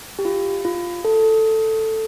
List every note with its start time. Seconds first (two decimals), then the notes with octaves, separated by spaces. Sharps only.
0.19 G4
0.25 F4
0.65 F4
1.05 A4